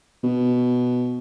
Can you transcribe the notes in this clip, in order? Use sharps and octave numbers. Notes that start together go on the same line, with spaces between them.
B2